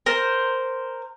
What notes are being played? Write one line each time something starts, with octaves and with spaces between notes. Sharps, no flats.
A#4 C5